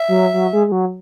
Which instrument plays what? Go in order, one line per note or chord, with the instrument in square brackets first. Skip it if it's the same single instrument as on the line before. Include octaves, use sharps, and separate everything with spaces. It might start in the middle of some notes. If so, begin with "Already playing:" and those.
Already playing: [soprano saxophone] E5
[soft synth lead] F#3
F#3
G#3
G#3
F#3